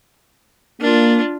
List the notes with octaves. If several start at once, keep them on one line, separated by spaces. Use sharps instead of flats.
A#3 D4 F4